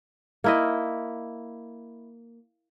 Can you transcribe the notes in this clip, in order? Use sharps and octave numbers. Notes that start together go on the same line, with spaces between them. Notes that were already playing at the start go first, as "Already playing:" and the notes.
A#3 E4 D#5